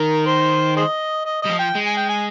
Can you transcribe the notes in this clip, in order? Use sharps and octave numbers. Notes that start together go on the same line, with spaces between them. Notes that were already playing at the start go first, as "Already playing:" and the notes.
Already playing: D#3 A#4
C5
G#4 C5 D#5
D#5
G3 D#5
F3
G5
G#3
G#5
G5
G#5